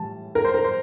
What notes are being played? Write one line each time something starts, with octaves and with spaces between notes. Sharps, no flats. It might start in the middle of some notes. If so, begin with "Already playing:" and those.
Already playing: A2 E3 G3 A5
A#4
C5
A#4
C5